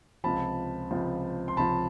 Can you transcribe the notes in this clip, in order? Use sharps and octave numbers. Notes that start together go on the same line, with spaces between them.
C#2 C3 F3 A5 B5
C#2 C3 F3
C6
C#2 C3 F3 A5 B5